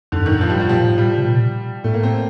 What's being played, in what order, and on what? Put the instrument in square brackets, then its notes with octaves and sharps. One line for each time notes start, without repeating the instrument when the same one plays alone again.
[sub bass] F2 [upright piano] D3
[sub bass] G2
[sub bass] A2 [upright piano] D#3
[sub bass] G2 [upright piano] F3
[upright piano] G3
[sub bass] G2
[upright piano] G3
[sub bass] A#2 [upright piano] F3
[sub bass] A2
[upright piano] G3
[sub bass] C3
A#2
[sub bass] A2 [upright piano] A3
[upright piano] A#3
C4